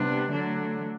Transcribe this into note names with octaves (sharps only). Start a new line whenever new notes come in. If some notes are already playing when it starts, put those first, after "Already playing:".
Already playing: C3 G3 B3 D4
D3 F#3 A3 D4